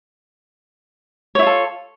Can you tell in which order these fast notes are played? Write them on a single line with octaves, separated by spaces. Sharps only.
C#5 E4 F4 A4